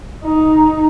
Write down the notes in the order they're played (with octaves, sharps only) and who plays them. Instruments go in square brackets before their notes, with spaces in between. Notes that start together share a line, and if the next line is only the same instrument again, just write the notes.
[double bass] D#4